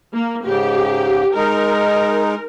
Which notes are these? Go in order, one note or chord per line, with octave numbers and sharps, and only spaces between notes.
A#3
G#2 C#3 G4
G#3 D#4 A#4